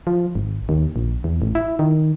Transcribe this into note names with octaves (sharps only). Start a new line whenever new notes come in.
F3
G#1
D#2
A#1
E2
A1
E4
D#3